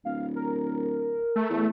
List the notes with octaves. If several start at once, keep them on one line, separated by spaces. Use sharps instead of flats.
D1 F5
A#4
A3
E2